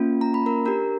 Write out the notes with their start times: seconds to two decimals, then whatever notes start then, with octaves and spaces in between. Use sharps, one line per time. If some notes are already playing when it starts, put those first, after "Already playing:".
Already playing: A#3 C#4 F4
0.21 A#5
0.34 B5
0.46 A#4 A#5
0.66 D4 G4 A#4 A#5